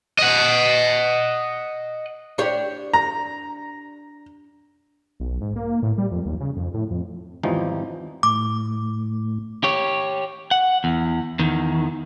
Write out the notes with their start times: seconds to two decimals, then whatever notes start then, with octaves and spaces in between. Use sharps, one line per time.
0.19 D#5 F#5
2.38 D4 G4 C#5
2.94 A#5
5.20 B1
5.41 G#2
5.56 A#3
5.83 A2
5.98 G3
6.12 F2
6.25 D#2
6.40 C#3
6.56 F2
6.74 A2
6.91 F2
7.43 G#1 E2 E3 F3 G3 D#4
8.23 A2 D6
9.64 G4 C#5
10.51 F#5
10.84 E2
11.39 E2 D#3